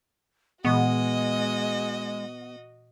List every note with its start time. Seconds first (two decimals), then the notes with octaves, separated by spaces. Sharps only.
0.65 A#2 E3 G#3 B3 F#4 D#5 C#6